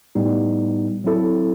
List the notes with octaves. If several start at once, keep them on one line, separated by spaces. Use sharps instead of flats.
A2 G3 B3 D#4
F#3 C4 E4 A4